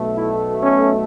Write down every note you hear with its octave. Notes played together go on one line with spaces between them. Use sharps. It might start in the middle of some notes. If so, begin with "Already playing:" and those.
Already playing: B1 B2 A3
E4
C#4